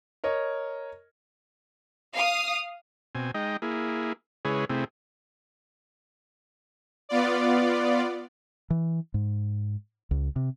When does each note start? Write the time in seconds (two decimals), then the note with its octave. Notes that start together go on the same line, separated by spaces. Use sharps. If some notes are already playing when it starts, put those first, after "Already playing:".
0.24 A#4 C#5 D#5
2.14 F5 D#6
3.15 B2 C4 G#5
3.34 G#3 D#4 D#5 G5
3.62 A#3 E4 G#4
4.45 C#3 G#3 E4 G#4 B4 C#5
4.69 C3 A3 C4 E4 G#4
7.09 B3 F4 D5
8.70 E3
9.14 G#2
10.11 C#2
10.36 C3